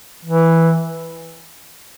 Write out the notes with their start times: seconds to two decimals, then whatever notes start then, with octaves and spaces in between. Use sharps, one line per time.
0.25 E3